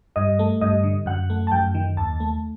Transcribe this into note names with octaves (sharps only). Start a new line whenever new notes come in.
G2 D#5
A3
G2 D#5
D3
F#2 F#5
A3
A5
F#2 G5
D#3
D#2 A5
A3